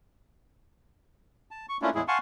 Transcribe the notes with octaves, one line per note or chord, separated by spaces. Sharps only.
A5
C#6
A3 A#3 C#4 D4 E4 F4
E2 A2 G#3 E4 G#4
F5 F#5 G#5 A5 C6 C#6